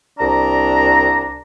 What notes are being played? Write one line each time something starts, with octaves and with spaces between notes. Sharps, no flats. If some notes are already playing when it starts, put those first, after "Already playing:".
C2 D4 A#5